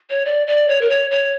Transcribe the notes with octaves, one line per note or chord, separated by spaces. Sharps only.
C#5
D5
D5
C#5
A#4
C#5
C#5